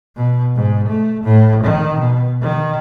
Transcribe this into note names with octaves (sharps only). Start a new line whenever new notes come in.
B2
G#2
A3
A2
D#3
B2
D#3